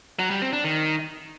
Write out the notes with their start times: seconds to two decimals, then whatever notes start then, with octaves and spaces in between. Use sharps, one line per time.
0.19 F#3
0.30 G3
0.42 C4
0.53 D4
0.64 D#3